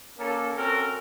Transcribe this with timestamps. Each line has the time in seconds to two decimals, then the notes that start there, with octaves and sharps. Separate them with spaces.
0.19 A#3 C#4 A4
0.57 C4 C#4 F#4 A4 A#4